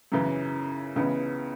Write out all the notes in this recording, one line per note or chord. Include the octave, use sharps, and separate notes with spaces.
F#2 C#3 E3
C#2 C#3 E3 B3